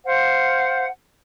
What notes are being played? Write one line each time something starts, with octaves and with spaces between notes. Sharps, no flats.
C5 F5 F#5